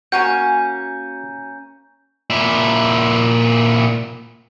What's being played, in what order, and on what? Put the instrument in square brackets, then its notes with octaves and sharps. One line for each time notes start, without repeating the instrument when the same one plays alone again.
[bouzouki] A#3 C#4 G#5 [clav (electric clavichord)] F#4 [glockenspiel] G6
[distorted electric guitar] A#2 E4